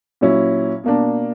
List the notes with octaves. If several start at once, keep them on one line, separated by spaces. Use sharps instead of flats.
A#2 F#3 C#4 E4
B2 A#3 D4